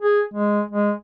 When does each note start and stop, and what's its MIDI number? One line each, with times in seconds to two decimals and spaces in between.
0.02 0.21 68
0.34 0.62 56
0.71 0.92 56